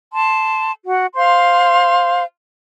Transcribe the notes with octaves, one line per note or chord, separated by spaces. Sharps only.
A5 C6
F#4 F#5
C5 F5 C6